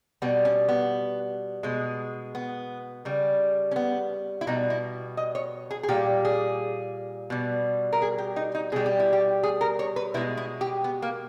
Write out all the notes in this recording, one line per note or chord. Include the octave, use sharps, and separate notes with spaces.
B2 G3 B3
C#4
B3
B2 G#3
B3
C#3 G3
C#4
B3
E4
B2 G3 D#4
E4
D#5
C#5
G#4
G#4
A#2 G3 G4
G#4
B2 G3
A#4
G#4
G4
D#4
D#4
B2 G3 G#4
G4
E4
G4
G#4
A#4
C#5
B4
B2 G#3 E4
E4
G4
B3
A#3